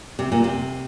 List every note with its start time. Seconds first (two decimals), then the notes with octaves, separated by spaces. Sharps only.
0.19 C3
0.32 A#2
0.44 C3